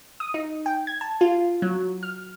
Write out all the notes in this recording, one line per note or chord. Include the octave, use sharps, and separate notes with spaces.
D#6
D#4
G5
G#6
A5
F4
F#3
F6